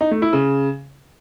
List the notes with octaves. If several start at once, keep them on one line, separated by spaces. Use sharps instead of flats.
D#4
A3
E4
C#3